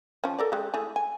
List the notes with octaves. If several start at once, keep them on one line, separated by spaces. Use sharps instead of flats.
F3 C#4
A4 A#4 D5
G#3 G4
A3 E4 G#4
G#5